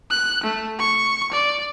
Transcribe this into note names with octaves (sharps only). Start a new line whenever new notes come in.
F#6
A3
C#6
D5